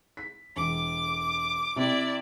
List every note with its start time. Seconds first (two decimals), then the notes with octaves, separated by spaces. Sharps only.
0.17 B6
0.57 E1 D6
1.76 C3 E4 D5